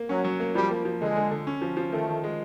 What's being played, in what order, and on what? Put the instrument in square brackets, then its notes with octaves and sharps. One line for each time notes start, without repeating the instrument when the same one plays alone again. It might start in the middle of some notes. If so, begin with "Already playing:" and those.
Already playing: [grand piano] A#3
[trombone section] F#3 [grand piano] C#4
[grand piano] F#3
A#3
[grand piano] F3 [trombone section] G3
[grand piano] A#3
F3
[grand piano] D3 [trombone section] G#3
[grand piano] D3
D3
C#4
F3
F3
[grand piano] D#3 [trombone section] A3
[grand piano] D#3
G#3